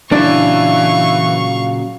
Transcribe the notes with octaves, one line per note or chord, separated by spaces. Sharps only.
A#2 C#3 E3 F#3 D4 F5 C#6